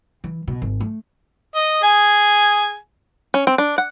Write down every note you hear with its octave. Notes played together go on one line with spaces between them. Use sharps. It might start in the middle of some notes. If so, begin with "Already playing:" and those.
E3
B2
G#1
A3
D#5
G#4 G#5
C#4
C4
D4
F#5